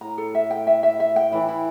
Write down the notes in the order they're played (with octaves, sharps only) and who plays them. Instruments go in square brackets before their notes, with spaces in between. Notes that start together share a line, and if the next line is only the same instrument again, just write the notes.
[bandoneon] A2 [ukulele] A#5
[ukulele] A4
E5
G5
E5
E5
E5
G5
[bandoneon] E3 [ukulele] E4
[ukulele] E4